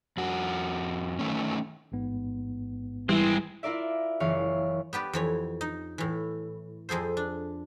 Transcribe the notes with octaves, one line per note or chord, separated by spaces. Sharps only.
F2 F#4
D#3 A3 C#4
A1 G#2 B3
E3 G3 G#3 C4 E4
E4 F4 A#4 D5 E5
F#1 E3 C#5 F5
B3 G4 B4 D5
F2 E3 C#5
D#4
A2 E3
F2 G#4 A4 C5
D4